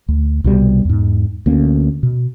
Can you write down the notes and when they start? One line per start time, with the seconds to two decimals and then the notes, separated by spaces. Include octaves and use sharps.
0.08 D2
0.44 C2 B2 F3 G3
0.85 E2 G#2
1.46 D2 A#3 C#4
2.03 B2